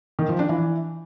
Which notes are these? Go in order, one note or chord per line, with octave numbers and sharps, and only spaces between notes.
D#3
F3
D4
E3